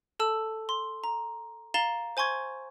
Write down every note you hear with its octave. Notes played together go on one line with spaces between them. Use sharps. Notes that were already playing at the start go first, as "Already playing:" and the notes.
A4 A5 E6
C6
A#5
F5 A#5 A6 E7 G7
C5 G#5 C6 C#6 G#6